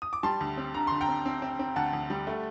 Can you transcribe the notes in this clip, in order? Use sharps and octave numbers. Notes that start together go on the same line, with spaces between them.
D#6
D6
G3 A5 C6
D2
C4
D3 A#5
D3 C6
G5 A#5
C4
C4
C4
C4
D2 F#5 A5
D2
G3
A3